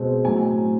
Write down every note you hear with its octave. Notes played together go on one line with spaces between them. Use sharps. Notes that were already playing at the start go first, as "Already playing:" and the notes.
Already playing: B2 G#3 C4
A2 F#3 A3 C4 G#5